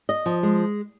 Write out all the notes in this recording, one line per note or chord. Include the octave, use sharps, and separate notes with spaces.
D#5
F3
G#3